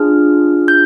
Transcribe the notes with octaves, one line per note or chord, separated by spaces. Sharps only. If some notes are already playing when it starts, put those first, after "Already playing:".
Already playing: D4 F4 G#4 F6
G6